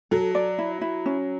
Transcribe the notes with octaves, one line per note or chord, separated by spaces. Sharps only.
F#3 A4
D5
E4
E4
C#4